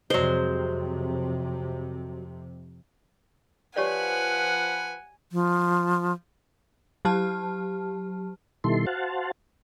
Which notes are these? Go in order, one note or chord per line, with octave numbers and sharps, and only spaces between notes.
F2 C3 F#3 G#3 C5
F3 G4 B4 C#5 D5 F#5 G#5
F3
F#3 G4 A5 F6
B2 D#3 G3 E4 A4 C6
F#4 C5 F5 F#5 A5